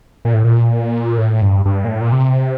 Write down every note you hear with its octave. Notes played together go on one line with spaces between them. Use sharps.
A#2
A2
A#2
A2
G2
G2
A#2
A2
A#2
C3